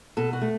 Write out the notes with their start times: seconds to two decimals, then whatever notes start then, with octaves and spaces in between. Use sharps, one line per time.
0.17 B2 A4
0.33 F#4
0.41 A3